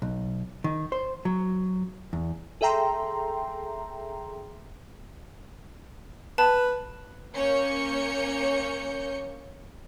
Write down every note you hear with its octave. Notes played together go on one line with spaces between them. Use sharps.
B1
D#3
C5
F#3
E2
G#4 A4 E5 G5 A#5 C6
B4 A5
A#3 C#4 C#5 G6 C#7